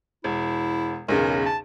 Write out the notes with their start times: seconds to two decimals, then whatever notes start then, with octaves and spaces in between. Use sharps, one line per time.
0.24 E1 E4
1.08 B1 E2 C#3 A#4
1.46 A5